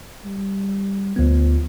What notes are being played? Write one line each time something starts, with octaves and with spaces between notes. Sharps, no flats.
G3
D2 F3 B3